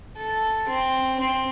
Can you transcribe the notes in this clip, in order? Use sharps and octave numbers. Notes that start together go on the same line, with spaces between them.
A4
C4
C4